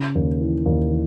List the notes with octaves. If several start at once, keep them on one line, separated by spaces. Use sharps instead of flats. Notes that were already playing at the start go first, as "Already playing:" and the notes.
Already playing: C#3
D#2
E3
D#2
E3